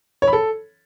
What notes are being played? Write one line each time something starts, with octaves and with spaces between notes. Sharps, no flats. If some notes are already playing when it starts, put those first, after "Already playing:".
C#5
B5
A4